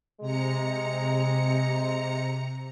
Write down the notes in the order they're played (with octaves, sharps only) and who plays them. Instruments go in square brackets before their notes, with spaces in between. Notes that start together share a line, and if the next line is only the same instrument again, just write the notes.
[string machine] C3 A#5 C#7 [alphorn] G#3